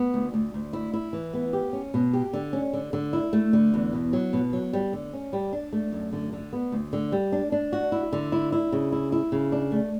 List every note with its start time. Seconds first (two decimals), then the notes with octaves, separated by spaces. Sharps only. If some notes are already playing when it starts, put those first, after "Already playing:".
Already playing: B3
0.14 D2
0.34 D2
0.54 D2
0.73 E4
0.93 E4
1.13 E3
1.34 B3
1.53 G4
1.73 C#4
1.94 B2
2.13 G4
2.33 D3
2.53 C#4
2.73 D3
2.93 D3
3.13 E4
3.33 A3
3.53 D3
3.74 E2
3.93 B2
4.13 F#3
4.33 B2
4.53 F#3
4.73 G3
4.93 D3
5.13 C#4
5.33 G3
5.53 D4
5.73 A3
5.93 F#2
6.13 D3
6.33 D3
6.53 B3
6.72 D2
6.93 D3
7.12 G3
7.32 D4
7.52 D4
7.73 F#4
7.92 E4
8.13 D3
8.32 E4
8.52 E4
8.72 C#3
8.92 E4
9.12 E4
9.32 C#3
9.52 D4
9.72 A3